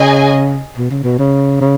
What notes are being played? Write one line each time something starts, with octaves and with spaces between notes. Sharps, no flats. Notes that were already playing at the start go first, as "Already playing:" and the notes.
Already playing: C#3 G#4 D#5 G#5
B2
C#3
B2
C#3
C#3